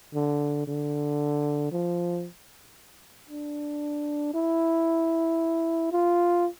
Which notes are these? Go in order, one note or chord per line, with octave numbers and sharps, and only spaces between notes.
D3
D3
F3
D4
E4
F4